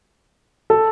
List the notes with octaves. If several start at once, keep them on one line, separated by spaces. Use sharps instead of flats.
A4